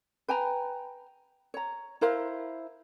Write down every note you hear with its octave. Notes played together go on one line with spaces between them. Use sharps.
B4 G5 G#5 A#5
C#5 A#5
E4 A#4 C5 F5